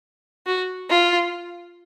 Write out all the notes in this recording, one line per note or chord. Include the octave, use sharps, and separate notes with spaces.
F#4
F4